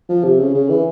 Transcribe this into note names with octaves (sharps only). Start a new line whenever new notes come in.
F3
C3
C#3
C#3
E3